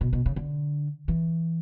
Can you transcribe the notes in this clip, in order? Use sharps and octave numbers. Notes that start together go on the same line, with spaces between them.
B2
B2
C#3
D3
E3